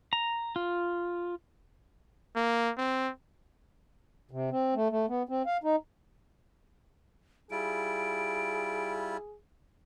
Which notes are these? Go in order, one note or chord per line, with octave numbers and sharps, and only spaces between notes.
A#5
F4
A#3
C4
C3
C4
A3
A3
B3
C4
F5
D#4
G3 E4 F4 G#4 D7